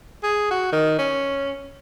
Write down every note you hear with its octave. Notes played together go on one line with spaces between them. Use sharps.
G#4
F#4
D#3
C#4